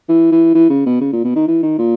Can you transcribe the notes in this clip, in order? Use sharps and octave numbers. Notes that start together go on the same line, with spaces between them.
E3
E3
E3
C#3
B2
C#3
A#2
B2
D#3
E3
D#3
A#2